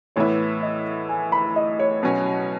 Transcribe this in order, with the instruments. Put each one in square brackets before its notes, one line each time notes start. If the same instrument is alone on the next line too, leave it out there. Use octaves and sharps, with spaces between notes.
[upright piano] A2 E3 B3 E4 [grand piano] C#5
[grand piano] D#5
G#5
B5
D#5
C#5
[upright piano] B2 F#3 C#4